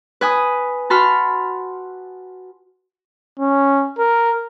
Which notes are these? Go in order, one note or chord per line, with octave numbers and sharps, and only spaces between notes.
B4 G#5 D#6
F#4 A5 B5 C6 F6
C#4
A#4